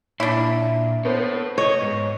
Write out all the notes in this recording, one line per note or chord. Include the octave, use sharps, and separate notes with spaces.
A#2 D4 E4
B3 A4 C5 C#5
C#5 D#5
G#2